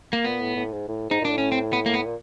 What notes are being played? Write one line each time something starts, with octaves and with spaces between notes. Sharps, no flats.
A#3
A#2 B3
A2
A2
G#2
A2
G#2 D#4
A#2 D4
A2
C#4
C4
B3
A#3
B3
A#2